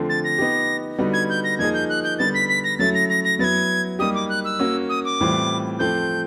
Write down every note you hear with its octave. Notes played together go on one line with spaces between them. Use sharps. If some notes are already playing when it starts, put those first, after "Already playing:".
Already playing: D3 F3 A3 C4
A6
A#6
B3 D#4 G4
D3 G3 B3 D#4 F#4
G#6
G6
A#6
F3 A#3 D#4 G#4 G#6
G6
F#6
G6
D3 G3 B3 A6
B6
B6
A#6
F#3 A3 C#4 E4 A6
A#6
A#6
A#6
F#3 B3 E4 G#6 A6
G3 A#3 D#4 G4 D#6
D6
F#6
E6
A#3 C#4 F#4
D#6
D6
A2 E3 G3 C4 F4
F3 A3 C4 G6